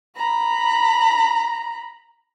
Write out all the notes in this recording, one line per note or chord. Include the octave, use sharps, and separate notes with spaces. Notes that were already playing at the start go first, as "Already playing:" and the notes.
A#5 B5